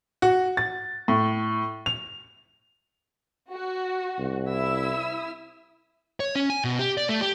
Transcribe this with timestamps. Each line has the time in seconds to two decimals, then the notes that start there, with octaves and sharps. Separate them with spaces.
0.22 F#4
0.57 A6
1.08 A2
1.86 F7
3.50 F#4
4.19 C2
4.48 E4 E5 E6
6.20 C#5
6.35 C#4
6.50 G#5
6.64 B2
6.79 G4
6.97 D5
7.09 A3
7.21 G4